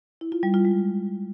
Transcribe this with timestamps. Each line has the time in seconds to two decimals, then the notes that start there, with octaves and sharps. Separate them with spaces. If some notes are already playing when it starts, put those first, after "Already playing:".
0.21 E4
0.32 F4
0.43 G3
0.54 F4
0.65 G#3